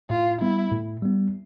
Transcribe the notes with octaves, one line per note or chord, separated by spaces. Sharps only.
A2 F4
G3 B3 E4
A2
G3 B3